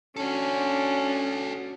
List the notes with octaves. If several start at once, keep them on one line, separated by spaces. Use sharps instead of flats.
C#4 D4 F#4 A4